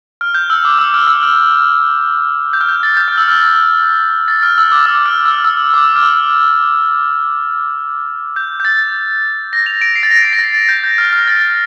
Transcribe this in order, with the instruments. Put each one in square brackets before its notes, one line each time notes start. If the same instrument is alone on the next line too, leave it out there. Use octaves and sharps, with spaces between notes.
[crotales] F6
G6
E6
D6
E6
F6
E6
F6
G6
F6
G6
A6
G6
F6
E6
F6
A6
F6
E6
D6
E6
F6
E6
E6
D6
F6
E6
G6
G6
A6
A#6
F7
D7
C7
A6
A#6
C7
A#6
A6
A6
G6
G6
F6
F6
A6